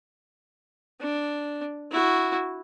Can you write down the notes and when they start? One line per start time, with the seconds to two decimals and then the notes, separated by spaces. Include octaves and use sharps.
1.00 D4
1.91 E4 F#4